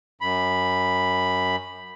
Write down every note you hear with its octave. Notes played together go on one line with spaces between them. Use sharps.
F#2 B5